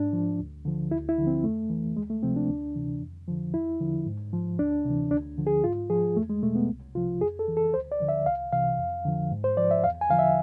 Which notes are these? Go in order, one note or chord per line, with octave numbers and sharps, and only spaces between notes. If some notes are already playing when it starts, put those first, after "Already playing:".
Already playing: G#2 D4
F3
D2
D3 F3
D2 E4
E4
D3 F3
C4
F2 A3
E3
D2 G#3
A3
C3 F3 C4
D4
D2
C3 E3
F2
D3 F3
E2 E4
D3 F3
G#2
F3
D2 D4
C3 E3
D2 D4
D3 F3
G#4
G#2 F4
F3 G#4
E2 A3
G#3
B2 A3
B3
C2
C3 F3 F4
F2 G#4
A4
E3
A4
D2 C5
D5
D3 F3
E5
C2 F5
C3 E3 F5
F2
D3 F3
G#2
C5
F3 D5
E5
E2 F5
G#5
D3 F3 F5
E5